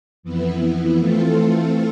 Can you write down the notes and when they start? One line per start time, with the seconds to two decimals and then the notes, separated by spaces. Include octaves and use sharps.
0.23 F2 E3 B3 E4
0.98 E3 A3 C4 F4 A4